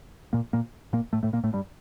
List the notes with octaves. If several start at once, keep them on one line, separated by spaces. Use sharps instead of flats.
A#2 A#3
A#2 A#3
A#2 A#3
A2 A3
A2 A3
A#2 A#3
A2 A3
G2 G3